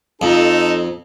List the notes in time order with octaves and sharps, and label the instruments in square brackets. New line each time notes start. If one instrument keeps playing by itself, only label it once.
[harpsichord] F2 [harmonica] D#4 A4